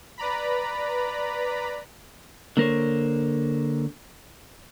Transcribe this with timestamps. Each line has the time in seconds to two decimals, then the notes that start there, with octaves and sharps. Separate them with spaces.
0.18 B4 D5 A#5 B5
2.57 D3 A#3 A#4 C5 C#5